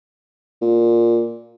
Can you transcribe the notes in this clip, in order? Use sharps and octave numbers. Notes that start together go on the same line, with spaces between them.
A#2